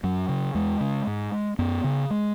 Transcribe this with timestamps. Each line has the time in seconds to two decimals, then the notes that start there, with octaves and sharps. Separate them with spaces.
0.03 F#2 F#3
0.29 C#3
0.55 E2 G#3
0.80 C#3
1.07 G#2
1.59 F#2 B3
1.84 C#3
2.10 G#3